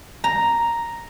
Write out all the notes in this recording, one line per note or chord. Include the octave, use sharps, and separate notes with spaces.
A#5